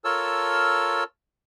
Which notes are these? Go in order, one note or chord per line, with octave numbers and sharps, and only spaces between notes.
F4 A4 A#4 C#5 A5 E6